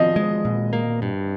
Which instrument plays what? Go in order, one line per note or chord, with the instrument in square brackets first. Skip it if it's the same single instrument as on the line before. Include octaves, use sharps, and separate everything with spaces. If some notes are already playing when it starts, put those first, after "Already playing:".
Already playing: [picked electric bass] F3 [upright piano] D#5
[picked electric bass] G#3
A#2
A#3
G2